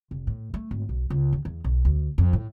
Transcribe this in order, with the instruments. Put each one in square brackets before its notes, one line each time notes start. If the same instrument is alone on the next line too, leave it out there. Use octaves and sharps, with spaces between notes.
[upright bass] F1
A2
A3
G#1
B1
C#2
D#2
E2
B1
D2
F2
A2